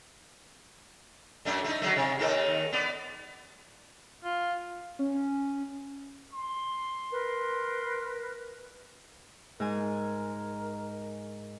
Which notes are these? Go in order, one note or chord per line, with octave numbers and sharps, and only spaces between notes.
F#2 A3 D4
A3 D#4
D3 F#3 A3
C3
D#2 D#3 A4
B3 D5
F4
C#4
C6
A#4 B4
G#2 A#4 G#5